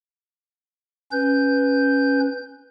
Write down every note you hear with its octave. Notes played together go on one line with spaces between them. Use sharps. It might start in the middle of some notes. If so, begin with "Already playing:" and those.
C#4 B4 G6